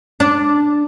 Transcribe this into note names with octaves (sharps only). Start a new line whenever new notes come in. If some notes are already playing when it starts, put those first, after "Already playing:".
D4